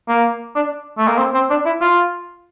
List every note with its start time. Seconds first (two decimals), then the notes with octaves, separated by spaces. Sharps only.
0.09 A#3
0.56 D4
0.98 A3
1.08 A#3
1.18 C4
1.34 C4
1.50 D4
1.65 E4
1.81 F4